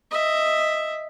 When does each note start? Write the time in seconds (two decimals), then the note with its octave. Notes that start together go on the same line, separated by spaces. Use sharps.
0.11 D#5 E5